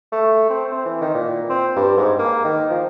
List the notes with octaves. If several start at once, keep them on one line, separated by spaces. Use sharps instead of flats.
A3
C4
C4
E3
D#3
A#2
C4
G2
G#2
A#3
D#3
F3